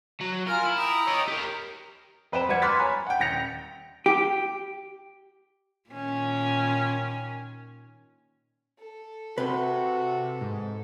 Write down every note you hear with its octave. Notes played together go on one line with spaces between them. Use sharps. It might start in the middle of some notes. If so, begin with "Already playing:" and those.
F#3
F4 A#4 G#5 F6
E4
G5 A#5 D#6
C#5 D#5
G4 A#4
F2 B4 C5 G5 E7
G3 B4 F#5 G#6 C#7
C6 D6 F6 F#6 A6 B6
C#5 G#5 A#5 B5
F#5 G5
D#1 G5 G6 A#6 C#7 F7
G4
A#2 D#3 C#4
A4
C3 F#4 B4 C6
G#2